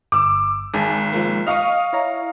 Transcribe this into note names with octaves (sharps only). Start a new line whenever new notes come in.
G1 D6 E6
G#1 G#4 G#5 A5
F3 G#3 A#3
D#5 F5 C#6 D#6 F6
E4 C#5 A#5